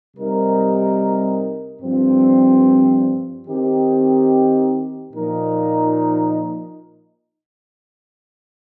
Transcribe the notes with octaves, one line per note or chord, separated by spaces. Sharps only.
C3 G3 D#4 A#4
G2 F3 C4
D#3 C4 D#4 G4
A#2 F3 D#4 A#4